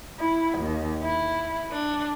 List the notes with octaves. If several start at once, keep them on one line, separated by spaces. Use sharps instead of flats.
E4
D#2
E4
D4